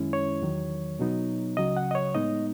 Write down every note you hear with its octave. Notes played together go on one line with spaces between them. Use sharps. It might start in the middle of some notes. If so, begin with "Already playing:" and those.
Already playing: F#2 D#3 G#3 C#4 E4
C#5
E2 D#3 F#3
B2 F#3 B3 D#4
C#2 C#3 F#3 D#5
F#5
D#5
C#5
A2 G#3 B3 D#4 D#5